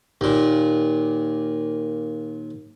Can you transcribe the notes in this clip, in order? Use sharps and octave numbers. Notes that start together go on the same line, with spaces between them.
D#2 A#2